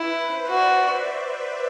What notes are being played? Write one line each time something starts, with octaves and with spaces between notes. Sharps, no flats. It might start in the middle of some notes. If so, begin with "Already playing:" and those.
Already playing: E4 B4
C5
F#4 D5
E5